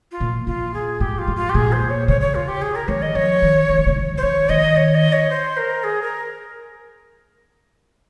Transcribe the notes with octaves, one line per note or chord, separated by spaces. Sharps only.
F4
A#2
A#2 F4
G#4
G#2 G4
F4
G#2
F4
G4
A#2 G#4
C5
C#5
C#3 C#5
C#5
F4
G4
G#4
A#4
D#3 C#5
D#5
F3 C#5
D#3
F3
D#3
C#3
D#3
C5
D#3 C#5
D#3 D#5
C#5
D#5
C#5
C5
A#4
G#4
A#4